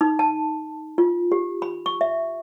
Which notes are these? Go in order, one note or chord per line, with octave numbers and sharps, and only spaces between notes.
D#4
A5
F4
G4
B5
C#6
E5